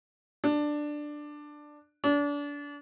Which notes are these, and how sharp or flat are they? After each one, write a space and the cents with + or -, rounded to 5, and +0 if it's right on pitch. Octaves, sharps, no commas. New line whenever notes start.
D4 +10
D4 -30